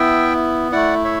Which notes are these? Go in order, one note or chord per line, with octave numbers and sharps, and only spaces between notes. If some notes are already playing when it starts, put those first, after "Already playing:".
Already playing: B3 E4 E5 G5
A3 E4 D5 F#5
C#5 E5